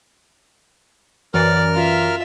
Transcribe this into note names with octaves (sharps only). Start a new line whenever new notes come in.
F#2 E3 A#4 D5 F6
F4 E5